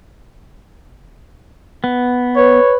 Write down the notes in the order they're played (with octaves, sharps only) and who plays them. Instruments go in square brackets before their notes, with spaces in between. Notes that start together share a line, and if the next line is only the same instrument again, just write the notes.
[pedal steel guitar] B3
[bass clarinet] B4 [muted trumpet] C#5